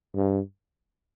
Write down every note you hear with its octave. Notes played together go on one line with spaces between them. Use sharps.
G2